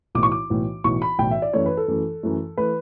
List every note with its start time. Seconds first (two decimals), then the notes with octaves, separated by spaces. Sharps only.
0.15 B1 A2 E3 D6
0.23 C#6
0.32 D6
0.50 B1 A2 E3
0.84 B1 A2 E3 C#6
1.02 B5
1.18 B1 A2 E3 G5
1.31 E5
1.42 D5
1.53 F#2 E3 A3 C#5
1.66 B4
1.77 A4
1.88 F#2 E3 A3
2.23 F#2 E3 A3
2.57 E3 A3 B4